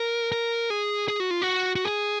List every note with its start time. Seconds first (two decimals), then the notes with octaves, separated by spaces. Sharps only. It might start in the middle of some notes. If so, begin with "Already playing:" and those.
Already playing: A#4
0.32 A#4
0.70 G#4
1.08 G#4
1.20 F#4
1.31 F4
1.42 F#4
1.75 F#4
1.84 G#4